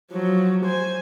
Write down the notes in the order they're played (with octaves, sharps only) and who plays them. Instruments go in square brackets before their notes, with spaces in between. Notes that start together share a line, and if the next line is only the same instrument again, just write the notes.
[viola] F3 F#3
C5 G#5